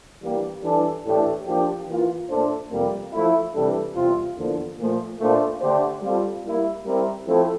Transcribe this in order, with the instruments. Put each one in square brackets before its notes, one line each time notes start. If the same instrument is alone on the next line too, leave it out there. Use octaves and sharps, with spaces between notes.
[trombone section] E3 G3 A#3 D4 G4
E3 G3 D4 A4
A2 E3 A3 D4 G4
F3 A#3 D4 G4
E3 A#3 F4
A#2 A3 D4 A4 C5
F2 C3 G3 A#3
F3 A3 E4
C3 E3 G3 D4 A4
E2 C3 G3 C4 F4
E2 D3 F3 A#3
A#2 F3 A3
A#2 A3 D4 F4 C5
D3 A3 D4 G4 C5
G3 C4 F4 A4
G3 A#3 E4 A#4
G3 C4 E4 G4 A#4
F3 A3 C4 E4 A4